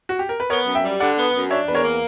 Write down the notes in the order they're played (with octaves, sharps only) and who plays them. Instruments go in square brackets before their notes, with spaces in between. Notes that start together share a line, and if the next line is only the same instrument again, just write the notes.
[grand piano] F#4
G4
A#4
B4
[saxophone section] B3 [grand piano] A#4 C#5
[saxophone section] F#2
[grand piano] E5 G5
[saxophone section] G3
[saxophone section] D3 [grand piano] D5 F#5
[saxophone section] B3
F#2
[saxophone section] D4 [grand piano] C#5 E5
[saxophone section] E2 [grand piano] B4
[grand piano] A#4 C#5
[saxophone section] A#3